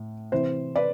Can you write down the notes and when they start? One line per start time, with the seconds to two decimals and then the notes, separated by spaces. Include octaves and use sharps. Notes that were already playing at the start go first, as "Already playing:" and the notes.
Already playing: A2
0.32 C3 E3 C5
0.76 B4 D5